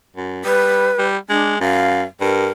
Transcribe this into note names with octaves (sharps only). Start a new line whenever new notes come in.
F#2
G3 B4
G3
G#3 D4
F#2 F5
G2 A#4